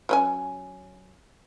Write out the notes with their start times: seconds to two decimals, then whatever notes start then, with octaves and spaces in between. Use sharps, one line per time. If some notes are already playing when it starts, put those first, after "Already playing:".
0.09 F#3 C#4 G#5